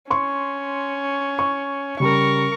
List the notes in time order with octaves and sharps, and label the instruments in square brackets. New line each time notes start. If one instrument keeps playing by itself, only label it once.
[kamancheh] C#4 [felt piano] C6 C#6
[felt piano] C#6
[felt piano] C#3 G3 [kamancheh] A#4 C#6